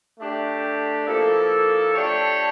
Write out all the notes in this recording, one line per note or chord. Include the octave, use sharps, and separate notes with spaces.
A3 D4 G4
F3 A#3 E4 A4
A3 D4 G4 C#5